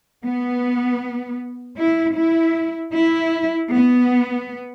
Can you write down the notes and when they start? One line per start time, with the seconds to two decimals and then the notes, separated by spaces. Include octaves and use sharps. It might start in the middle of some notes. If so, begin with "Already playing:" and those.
0.22 B3
1.79 E4
2.17 E4
2.95 E4
3.73 B3